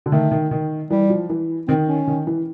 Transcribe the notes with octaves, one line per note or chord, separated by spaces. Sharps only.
D3
D#3 A3
D#3
D#3
E3 G3
F3
E3
D#3 C4
C#4
D#3
E3